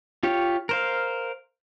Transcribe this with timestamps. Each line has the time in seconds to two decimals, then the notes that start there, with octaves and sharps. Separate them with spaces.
0.23 F4 G4 C#5
0.69 A#4 C5 F5